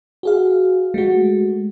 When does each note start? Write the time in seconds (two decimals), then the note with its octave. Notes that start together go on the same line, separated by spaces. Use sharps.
0.23 F#4 G#4 F5
0.94 G#3 A3 F#4